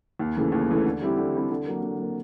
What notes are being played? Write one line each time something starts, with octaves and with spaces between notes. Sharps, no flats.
D#2
C#3 E3 A3
D#2
C#3 E3 A3
D3
G3 C4 E4 G4
D3
G3 C4 E4 G4
D3
F#3 A#3
D3
F#3 A#3